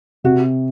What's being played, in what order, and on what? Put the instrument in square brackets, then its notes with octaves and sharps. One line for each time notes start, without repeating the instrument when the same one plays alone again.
[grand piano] C3 [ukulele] F#4